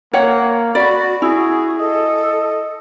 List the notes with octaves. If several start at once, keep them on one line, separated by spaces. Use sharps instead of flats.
A#3 C#5 F#5
F#4 D5 B5
E4 F#4 G#4
A4 D#5